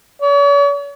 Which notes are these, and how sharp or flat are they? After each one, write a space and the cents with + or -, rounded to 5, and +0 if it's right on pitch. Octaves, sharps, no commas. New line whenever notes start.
C#5 +45